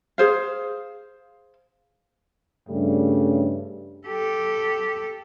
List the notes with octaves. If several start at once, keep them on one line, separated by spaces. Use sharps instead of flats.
G#4 C5 F5
G2 C#3 G3 A3
G4 A4